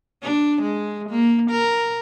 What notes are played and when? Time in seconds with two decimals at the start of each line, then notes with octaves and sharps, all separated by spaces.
0.23 D4
0.62 G#3
1.10 A#3
1.51 A#4